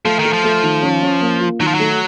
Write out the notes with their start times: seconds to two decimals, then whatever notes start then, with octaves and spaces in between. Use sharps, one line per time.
0.05 F3 A3
0.19 D#3
0.24 A3
0.33 F3
0.44 A3
0.63 D#3
0.82 C#4
1.02 C#4
1.21 A#3
1.40 F4
1.61 D#3 F#3
1.67 F3
1.74 F#3
1.80 A3